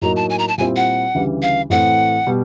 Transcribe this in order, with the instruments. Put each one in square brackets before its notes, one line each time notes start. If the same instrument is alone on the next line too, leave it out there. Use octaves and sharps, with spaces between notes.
[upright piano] A2 F#3 A#3 D#4 F#4 [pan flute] A#5
[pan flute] A5
G#5
A#5
A5
[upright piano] A#2 G3 C4 E4 [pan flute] G#5
[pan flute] F#5
[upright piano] D2 C#3 E3 G3
[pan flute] F5
[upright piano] A2 E3 A3 C4 [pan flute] F#5
[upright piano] B2 G3